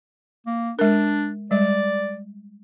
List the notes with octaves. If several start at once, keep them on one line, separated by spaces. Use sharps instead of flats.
A#3
G#3 D4 A#4
G3 G#3 D5